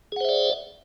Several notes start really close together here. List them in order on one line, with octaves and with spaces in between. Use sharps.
G#4 F#5 C5 E5 D5